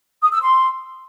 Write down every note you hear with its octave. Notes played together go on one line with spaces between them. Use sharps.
D#6
E6
C6